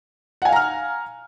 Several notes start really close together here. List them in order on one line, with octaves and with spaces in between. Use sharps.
F#5 G#5 F5 A#5 F6